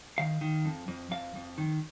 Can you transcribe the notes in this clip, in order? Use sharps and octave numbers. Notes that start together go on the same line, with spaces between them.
D#3 F5
D#3
F2
F2
F2 F5
F2
D#3